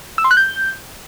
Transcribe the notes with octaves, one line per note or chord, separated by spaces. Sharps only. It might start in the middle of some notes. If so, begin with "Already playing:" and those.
E6
C6
F#6
G6